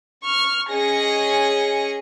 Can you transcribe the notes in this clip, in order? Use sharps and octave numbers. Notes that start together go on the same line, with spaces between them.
C#6 F6
C#4 G#4 D#5 G#5 A#6 C#7